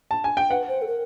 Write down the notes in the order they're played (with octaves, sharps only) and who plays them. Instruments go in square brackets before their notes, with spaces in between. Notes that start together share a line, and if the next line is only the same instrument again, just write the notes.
[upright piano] A5
G#5
G5
[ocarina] B4 [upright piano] F#5
[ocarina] C5
A4
A#4